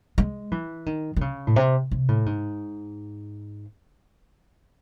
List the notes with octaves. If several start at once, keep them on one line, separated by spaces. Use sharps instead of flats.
G#3
E3
D#3
D#3
C#3
A2
C3
C3
A2
G#2